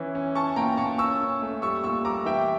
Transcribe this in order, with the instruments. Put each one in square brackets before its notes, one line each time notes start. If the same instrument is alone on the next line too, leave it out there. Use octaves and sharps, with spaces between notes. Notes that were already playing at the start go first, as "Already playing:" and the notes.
Already playing: [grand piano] E3 C#4
C#4
C#4 A5 C#6
A#2 G5 A#5
A#2 A5 C#6
C#4 C#6 E6
C#4
A3
G3 C#6 E6
A#2 C#6 E6
G3 A#5 D6
E3 E5 G5